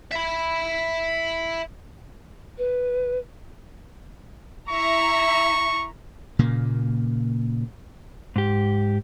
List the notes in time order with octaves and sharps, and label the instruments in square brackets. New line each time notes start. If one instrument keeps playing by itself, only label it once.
[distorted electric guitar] E5 B5
[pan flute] B4
[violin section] E4 E5 A#5 [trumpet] C#6
[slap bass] A#2 C#3 A#3
[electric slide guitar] G#2 G4